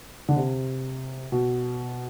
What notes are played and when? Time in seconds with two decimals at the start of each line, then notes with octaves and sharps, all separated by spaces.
0.29 D3
0.37 C3
1.32 B2